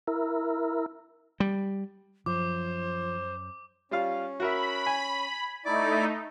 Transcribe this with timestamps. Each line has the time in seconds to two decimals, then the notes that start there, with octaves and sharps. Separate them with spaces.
0.07 E4 A#4
1.40 G3
2.26 F#2 F3 C5 D6
3.91 G3 C#4 F4 F5
4.40 F#4 A#4 E5 B5
4.86 G#5
5.65 A3 D#4 E4 D5 D6